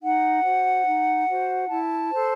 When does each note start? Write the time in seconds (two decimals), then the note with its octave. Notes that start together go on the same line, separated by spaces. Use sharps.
0.01 D#4 F#5
0.44 F#4 C5
0.85 D#4
1.27 F#4 C5
1.68 E4 A5
2.11 A4 C5